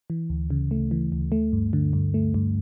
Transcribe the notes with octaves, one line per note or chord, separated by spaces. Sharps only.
E3
D2
C#3
A3
E3
D2
A3
G2
D3
G2
A3
G2